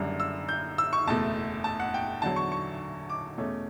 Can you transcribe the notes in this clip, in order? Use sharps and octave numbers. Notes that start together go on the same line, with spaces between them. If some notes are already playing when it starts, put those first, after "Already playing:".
Already playing: F#1 F#2 D3 G3
E6
G6
E6
C#6
F#1 E2 B2 A3 A5
A5
F#5
G5
E2 D3 F#3 A5
C#6
C#6
D6
E2 B2 A3 C#4